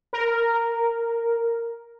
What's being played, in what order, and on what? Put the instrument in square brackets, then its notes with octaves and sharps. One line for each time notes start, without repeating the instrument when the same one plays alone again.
[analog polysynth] A#4